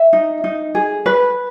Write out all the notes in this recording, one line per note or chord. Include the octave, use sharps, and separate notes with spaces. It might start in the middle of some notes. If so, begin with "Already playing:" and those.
Already playing: E5
D#4
D#4
G#4
B4